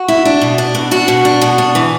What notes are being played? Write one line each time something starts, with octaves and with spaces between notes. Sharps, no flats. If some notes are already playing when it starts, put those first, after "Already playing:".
Already playing: F#4
E4
D4
B2
D4
B2
D4 F#4
B2
D4
B2
D4
E3